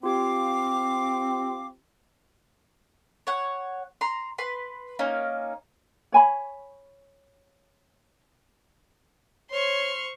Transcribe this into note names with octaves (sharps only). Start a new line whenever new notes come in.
C4 F4 G4 F5 D6
C#5 F#5
A#5 C6
B4 C6
A#3 C#4 D#4
C#5 G#5 B5
C5 C#5 C6 C#6 F6